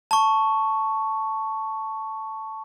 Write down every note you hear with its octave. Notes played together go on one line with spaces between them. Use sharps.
A5 C#6